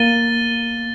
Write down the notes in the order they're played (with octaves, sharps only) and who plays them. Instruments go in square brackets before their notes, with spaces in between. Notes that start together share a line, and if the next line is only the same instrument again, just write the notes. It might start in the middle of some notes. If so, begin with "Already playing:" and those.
Already playing: [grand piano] A#3 [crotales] A6 D#7 G7